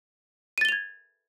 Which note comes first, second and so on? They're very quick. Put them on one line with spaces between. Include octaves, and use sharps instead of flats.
D#7 A6 G7 F7 G#6